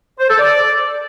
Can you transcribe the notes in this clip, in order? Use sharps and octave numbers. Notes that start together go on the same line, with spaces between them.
C5
A4
D5